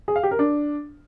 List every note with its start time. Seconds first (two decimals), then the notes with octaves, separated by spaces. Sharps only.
0.08 G#4
0.16 F5
0.23 G4
0.31 A#4
0.39 D4